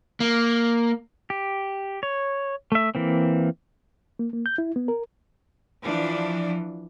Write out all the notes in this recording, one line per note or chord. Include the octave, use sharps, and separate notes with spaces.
A#3
G4
C#5
A3 E5
E3 A#3 C4
A#3
A#3
G6
E4
B3
A#4
E3 F3 D4